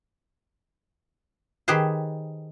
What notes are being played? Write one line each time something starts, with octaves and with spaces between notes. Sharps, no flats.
D#3 G4 G#4 B4 C5